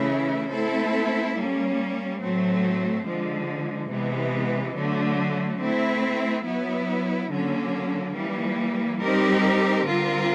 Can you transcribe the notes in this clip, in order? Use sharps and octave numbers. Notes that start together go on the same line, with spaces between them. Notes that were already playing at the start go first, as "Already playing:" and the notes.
Already playing: C#3 E3 A3 C#4 E4
A3 C4 E4 A4
G3 A#3 C#4
A2 F#3 A3 C4
D3 F3 G#3
C3 E3 G#3 B3
D3 F#3 A3
A3 C4 E4
F#3 B3 E4
D3 F#3 A#3 C#4
E3 G3 A#3
G3 C4 D#4 G4 A#4
D3 G3 C4 F4 A#4